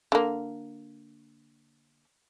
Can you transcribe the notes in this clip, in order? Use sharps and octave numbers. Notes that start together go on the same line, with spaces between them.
D3 A#3